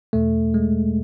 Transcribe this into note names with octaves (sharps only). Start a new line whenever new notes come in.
E2 B2 A3
G#3